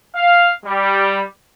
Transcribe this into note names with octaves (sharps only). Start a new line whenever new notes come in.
F5
G3